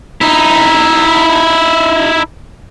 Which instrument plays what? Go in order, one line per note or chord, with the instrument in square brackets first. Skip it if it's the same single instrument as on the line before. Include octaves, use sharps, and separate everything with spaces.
[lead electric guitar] D#4 E4